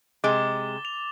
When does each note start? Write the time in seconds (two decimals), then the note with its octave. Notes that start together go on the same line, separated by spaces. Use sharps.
0.24 C3 G#3 D6 A6 G7
0.85 F7